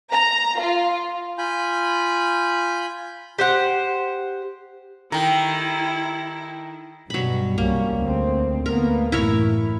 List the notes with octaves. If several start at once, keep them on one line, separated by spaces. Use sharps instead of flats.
A#5
F4
F4 G#5 B5 G6
G4 C5 F#5
D#3 E4 G4 A4 A#5
G2 B2 F#3 G3 B5
C2 G3 A#3 C#4
D2 C4
D2 A#3 B3 A#4
A1 F#2 A2 E4 A#4 C#5